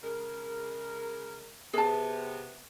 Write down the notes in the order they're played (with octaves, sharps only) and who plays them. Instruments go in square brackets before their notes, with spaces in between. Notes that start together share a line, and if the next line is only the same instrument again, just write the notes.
[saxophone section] C#3 G#3 A#4
[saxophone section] C3 B3 [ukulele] G#4 A5